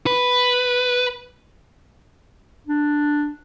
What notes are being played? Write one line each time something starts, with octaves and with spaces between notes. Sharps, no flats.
B4
D4